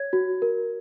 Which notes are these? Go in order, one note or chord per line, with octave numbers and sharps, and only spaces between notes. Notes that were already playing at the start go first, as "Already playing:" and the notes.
Already playing: C#5 G#6
F#4
A#4